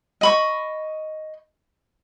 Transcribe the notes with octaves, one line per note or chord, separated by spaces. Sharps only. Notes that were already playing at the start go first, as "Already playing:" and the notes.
D#5 B5 C#6